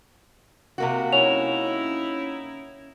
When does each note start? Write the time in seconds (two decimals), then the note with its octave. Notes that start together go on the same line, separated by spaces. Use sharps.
0.78 C3 A#3 F#4
1.13 C#4 D#4 E4 F7